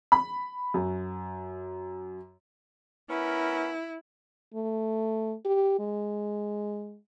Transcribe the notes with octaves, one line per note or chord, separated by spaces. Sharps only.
B5
F#2
B3 C#4 E4 A#4
A3
G4
G#3